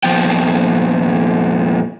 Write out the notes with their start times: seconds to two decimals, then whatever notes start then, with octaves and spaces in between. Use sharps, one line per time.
0.03 F2 A#2 F3 B3 G5